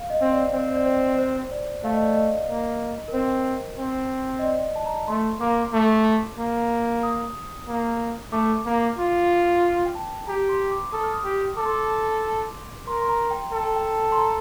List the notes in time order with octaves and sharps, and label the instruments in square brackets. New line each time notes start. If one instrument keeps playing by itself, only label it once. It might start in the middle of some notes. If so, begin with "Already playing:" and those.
Already playing: [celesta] F5
D#5
[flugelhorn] C4
[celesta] D5
[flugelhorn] C4 [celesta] C5
[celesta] D5
C5
C5
D5
[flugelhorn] A3 [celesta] F5
[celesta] D#5
D5
D#5
[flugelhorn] A#3
[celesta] A#4
[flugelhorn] C4 [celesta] C5
[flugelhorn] C4
[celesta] D#5
D5
A5
A#5
A5
[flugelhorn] A3 [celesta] C6
[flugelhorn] A#3 [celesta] D6
[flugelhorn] A3
A#3
[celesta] D#6
[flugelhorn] A#3
[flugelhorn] A3 [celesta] D6
[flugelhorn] A#3
F4
[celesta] G5
A5
[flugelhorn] G4 [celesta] A#5
[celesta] C6
D6
[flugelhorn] A4 [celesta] D#6
[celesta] F6
D#6
[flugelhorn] G4
[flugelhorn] A4 [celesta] D6
[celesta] C6
D6
[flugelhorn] A#4 [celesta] C6
[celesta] C6
A#5
G5
[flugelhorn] A4 [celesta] G5
[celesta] A5
G5
C6
A#5